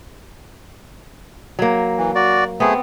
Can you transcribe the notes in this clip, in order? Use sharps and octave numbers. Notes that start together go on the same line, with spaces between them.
F#3 A#3
E3
F#4 D5
A3 B3 C4 G#4